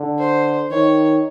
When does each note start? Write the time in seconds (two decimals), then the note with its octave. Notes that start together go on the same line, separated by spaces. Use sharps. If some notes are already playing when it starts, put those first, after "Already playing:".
Already playing: D3
0.19 C5
0.71 D#3 C#5